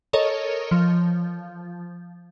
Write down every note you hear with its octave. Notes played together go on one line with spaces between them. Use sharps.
A4 A#4 C#5 D#5
F3